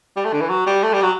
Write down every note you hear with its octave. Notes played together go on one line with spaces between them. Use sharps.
G3
A3
D3
E3
F#3
G3
A3
G3
F#3